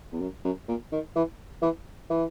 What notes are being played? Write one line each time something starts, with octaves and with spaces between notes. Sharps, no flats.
E2
F#2
F#2
A#2
D#3
E3
E3
E3